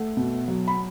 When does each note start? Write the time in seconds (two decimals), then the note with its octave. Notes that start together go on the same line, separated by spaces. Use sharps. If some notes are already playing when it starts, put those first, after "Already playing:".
Already playing: A3 F#5
0.17 B2
0.48 F#3
0.68 B5